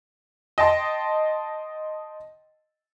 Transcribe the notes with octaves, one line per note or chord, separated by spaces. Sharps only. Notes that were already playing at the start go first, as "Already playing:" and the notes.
D#5 G5 A5 C6